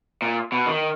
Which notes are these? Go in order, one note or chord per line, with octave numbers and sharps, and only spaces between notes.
A#2
B2
D#3